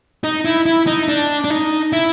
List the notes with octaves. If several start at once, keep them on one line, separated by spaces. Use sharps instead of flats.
D#4
E4
E4
D#4
D4
D4
D#4
E4